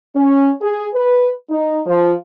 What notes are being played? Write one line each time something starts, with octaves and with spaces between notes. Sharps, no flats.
C#4
G#4
B4
D#4
F3